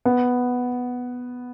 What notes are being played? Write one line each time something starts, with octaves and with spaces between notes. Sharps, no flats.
B3